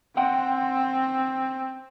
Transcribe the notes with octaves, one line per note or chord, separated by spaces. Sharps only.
C4 F#5 G5 C6